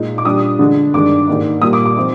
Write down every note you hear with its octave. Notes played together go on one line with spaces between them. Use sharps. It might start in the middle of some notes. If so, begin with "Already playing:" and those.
Already playing: A#2 G#3 D#4
D6
A#2 G3 D4 D#6
D3 G#3 D4
G2 D#3 G#3 D4 D6
G#2 D#3 A#3 D#4
A#2 G3 A#3 D#6
D6
D6
F3 C4 D#4